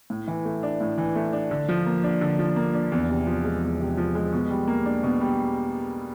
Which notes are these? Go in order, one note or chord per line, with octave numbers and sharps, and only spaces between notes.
A2
E3
A3
D4
A2
E3
A3
D4
D3
F3
A#3
D4
D3
F3
A#3
D4
E2
C3
F3
G#3
E2
C3
F3
G#3
B2
G3
A#3
D4
B2
G3